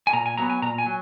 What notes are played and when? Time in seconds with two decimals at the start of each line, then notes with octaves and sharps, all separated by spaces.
0.07 G#5
0.13 A#2 A#5
0.26 G#5
0.38 F#3 B3 A#5
0.50 G#5
0.62 A#2 A#5
0.78 G#5
0.86 F#3